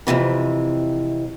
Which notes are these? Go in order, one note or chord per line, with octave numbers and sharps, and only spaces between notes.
F2 G#2 C3 E3